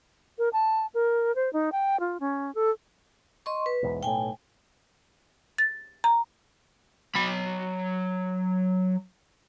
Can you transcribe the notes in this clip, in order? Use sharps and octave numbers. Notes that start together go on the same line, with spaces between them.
A#4
A5
A#4
C5
D#4
G5
F4
C#4
A4
D#5 C6 C#6
B4
B1 E2 G#2
B1 A2 G5 G#5
A6
A#5
F#3 B5